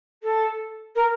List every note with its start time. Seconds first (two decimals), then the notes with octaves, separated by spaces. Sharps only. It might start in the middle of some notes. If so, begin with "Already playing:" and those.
0.23 A4
0.95 A#4